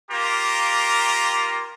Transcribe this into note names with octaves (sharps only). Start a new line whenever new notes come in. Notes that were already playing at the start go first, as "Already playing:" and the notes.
A#3 F4 G4 A#4 A#5